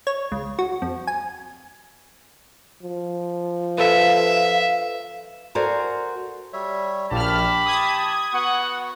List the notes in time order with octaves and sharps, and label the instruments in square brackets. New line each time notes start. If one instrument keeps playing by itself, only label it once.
[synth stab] C#5
C#2
F#4
F2
G#5
[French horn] F3
[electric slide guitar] A4 B4 [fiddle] E5 [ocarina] F5
[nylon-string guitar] F#4 A4 A#4 C5 D5 G#5
[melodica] G3 C#5 E5
[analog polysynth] A#1 F6 [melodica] G4 [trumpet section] A5 B5
[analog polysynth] D#6 G#6
[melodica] B3 F#4 [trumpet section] F#5